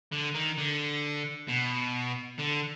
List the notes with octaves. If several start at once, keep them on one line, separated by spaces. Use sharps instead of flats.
D3
D#3
D3
B2
D3